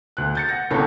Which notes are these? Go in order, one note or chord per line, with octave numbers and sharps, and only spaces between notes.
D2 F#6
G6 A6 C#7
F#5 A#6
G1 C2 B3 C#4 A4 G5